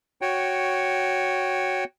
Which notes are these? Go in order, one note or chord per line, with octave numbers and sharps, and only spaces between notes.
F#4 C#5 G5